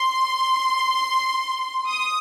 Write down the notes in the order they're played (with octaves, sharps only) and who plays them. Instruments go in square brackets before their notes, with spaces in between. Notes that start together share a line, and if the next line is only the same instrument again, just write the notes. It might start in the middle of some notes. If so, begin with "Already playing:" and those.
Already playing: [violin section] C6
D#6